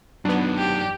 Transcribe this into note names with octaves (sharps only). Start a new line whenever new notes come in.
F#2 F#3 B3 D4 D#4
G4